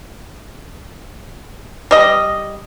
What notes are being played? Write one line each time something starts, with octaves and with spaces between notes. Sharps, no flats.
G3 D#5